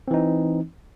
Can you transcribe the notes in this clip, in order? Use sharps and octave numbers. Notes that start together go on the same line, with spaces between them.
E3 C4 D#4